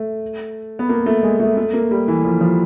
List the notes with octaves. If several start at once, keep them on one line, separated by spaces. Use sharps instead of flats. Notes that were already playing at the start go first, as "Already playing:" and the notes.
Already playing: A3
B3
A#3
A3
G#3
A3
A3
A#3
G3
E3
F3
F3